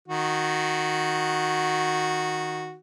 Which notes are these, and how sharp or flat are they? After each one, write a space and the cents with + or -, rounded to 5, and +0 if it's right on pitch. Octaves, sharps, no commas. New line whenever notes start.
D#3 +0 F#4 -10